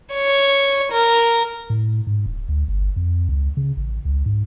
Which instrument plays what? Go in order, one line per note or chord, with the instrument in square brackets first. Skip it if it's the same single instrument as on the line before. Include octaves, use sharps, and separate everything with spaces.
[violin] C#5
A#4
[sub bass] A2
G#2
D1
D2
G1
F2
C#2
C#3
A1
C#2
G#2